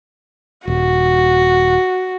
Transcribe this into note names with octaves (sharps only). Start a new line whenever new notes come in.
D#1 F#4